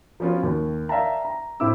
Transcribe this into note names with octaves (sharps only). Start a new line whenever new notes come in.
F3 B3 C#4 F4 F#4
D#2
D5 E5 F5 G5 A5 A#5
A#5
A2 C4 E4 D6 E6